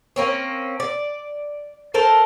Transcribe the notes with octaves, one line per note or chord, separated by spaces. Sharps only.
A#3 C4 C#4
D5
A4 A#4 C5 A5